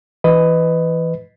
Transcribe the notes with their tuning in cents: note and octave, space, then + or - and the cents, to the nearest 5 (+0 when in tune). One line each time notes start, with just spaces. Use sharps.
E3 +0 B4 +15 D#5 +0